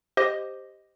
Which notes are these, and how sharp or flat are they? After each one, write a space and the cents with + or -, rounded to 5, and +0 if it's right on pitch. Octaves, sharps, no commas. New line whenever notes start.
G4 +0 C5 +0 D#5 +0